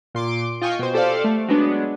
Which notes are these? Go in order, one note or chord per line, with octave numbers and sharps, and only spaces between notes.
A#2 C6 D6 D7
F4 D#5 G5 G#5 C#6
B2 C5
G4 A4 C5 D5 F5
A3
F#3 G#3 B3 D4